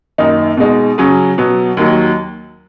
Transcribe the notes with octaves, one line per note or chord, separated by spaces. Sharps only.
F#2 D#3 A#3 D#4
B2 G#3 D#4
C#3 F#3 C#4
B2 F#3 B3
D#2 D#3 F#3